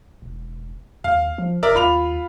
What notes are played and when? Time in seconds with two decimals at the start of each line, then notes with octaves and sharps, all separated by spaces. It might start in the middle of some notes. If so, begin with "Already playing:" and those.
0.22 E1
1.04 D#2 F5
1.38 F3
1.63 F1 A#4 D5 E5
1.75 D#2 F4 B5 F7